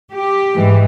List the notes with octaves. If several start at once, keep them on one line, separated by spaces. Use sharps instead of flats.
G4
G#2 E3 G#3